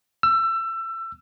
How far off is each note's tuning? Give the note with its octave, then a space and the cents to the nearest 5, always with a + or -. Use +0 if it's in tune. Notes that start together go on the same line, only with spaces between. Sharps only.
E6 +25